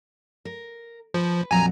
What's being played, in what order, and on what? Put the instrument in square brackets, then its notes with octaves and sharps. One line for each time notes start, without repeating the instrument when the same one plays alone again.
[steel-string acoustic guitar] A#4
[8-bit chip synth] F3 [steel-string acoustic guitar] B4
[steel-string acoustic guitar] F2 A#2 F#3 [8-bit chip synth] G#5 A#5